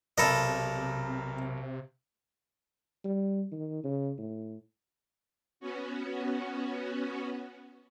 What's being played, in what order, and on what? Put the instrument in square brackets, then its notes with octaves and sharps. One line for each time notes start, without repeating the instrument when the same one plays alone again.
[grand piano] B1 A#4 B5 [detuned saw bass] C3 [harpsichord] A4 D#5
[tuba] G3
D#3
C#3
A2
[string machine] B3 C#4 F#4